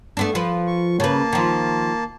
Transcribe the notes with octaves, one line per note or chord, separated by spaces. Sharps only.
A3 B3 D4
F3 B4
C#6
C#3 A#3 B4 A5
D#3 F3